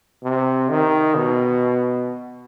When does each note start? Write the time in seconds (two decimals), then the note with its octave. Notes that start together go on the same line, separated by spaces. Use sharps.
0.23 C3
0.69 D#3
1.15 B2